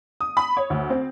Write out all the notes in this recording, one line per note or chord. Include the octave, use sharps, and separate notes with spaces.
D#6
B5
C#5
D2
C4